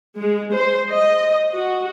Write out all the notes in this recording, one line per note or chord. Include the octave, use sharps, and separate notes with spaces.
G#3
C5
D#5
F#4